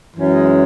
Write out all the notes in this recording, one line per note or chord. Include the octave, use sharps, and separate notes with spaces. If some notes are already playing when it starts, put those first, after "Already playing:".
F#2 E3 G#3 C#4